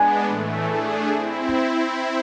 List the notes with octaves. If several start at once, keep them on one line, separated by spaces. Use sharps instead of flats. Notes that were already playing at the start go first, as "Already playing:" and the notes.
Already playing: G#3 B3 D4 G#5
A2 E3 A3
A3 D4 G#4
C4 E4